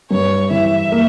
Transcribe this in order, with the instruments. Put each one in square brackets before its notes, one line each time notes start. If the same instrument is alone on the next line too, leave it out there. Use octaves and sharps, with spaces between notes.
[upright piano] G2 [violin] C#5
[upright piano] E3 [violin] E5
[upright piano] A#3